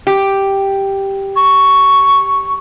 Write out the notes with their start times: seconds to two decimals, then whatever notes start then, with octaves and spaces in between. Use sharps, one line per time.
0.07 G4
1.36 C#6